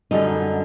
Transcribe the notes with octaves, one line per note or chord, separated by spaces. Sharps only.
F#2 D3 G3 D#4